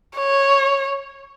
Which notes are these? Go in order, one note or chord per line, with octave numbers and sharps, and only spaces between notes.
C#5